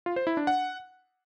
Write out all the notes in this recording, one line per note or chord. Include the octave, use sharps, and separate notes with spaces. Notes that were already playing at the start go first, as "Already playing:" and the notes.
F4
C5
E4
D4
F#5